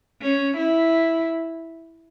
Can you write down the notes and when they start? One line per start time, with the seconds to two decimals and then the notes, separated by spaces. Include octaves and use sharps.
0.21 C#4
0.57 E4